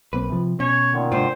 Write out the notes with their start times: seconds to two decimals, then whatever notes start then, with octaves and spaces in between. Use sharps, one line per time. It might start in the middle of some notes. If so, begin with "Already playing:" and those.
0.13 B1 A#3 C4 B4
0.29 C3 F3
0.60 B2 C#4 C#5
0.91 A#2 D3 D#3
1.12 G#2 C3 A#3 C4 D4 F4 C5